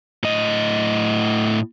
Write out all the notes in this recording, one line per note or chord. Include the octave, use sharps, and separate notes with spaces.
A2 D#5